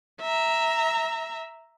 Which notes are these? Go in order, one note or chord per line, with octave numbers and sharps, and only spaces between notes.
E5 A#5